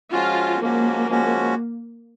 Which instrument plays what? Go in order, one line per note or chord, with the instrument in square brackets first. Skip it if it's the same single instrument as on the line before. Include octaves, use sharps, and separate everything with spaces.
[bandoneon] F3 G#3 C#4 F#4 [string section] F4
[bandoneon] F3 G#3 C#4 F#4 [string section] A#3
[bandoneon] F3 G#3 C#4 F#4